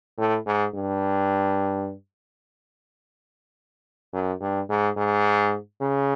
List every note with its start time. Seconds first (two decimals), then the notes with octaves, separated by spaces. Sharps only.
0.18 A2
0.46 G#2
0.74 G2
4.13 F#2
4.41 G2
4.69 G#2
4.97 G#2
5.81 C#3